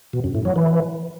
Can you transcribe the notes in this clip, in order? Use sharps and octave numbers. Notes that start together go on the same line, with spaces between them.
B2
F#2
A2
F#3
E3